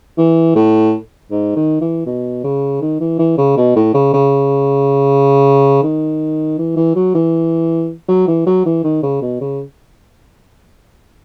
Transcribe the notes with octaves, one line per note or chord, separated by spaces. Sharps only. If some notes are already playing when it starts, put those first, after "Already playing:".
E3
A2
G#2
D#3
E3
B2
C#3
D#3
E3
E3
C#3
B2
A2
C#3
C#3
D#3
E3
E3
F#3
E3
F#3
E3
F#3
E3
D#3
C#3
B2
C#3